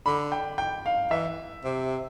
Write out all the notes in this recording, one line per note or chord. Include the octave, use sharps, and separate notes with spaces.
D3 B5
G5
G5
F5
E3 E5
C3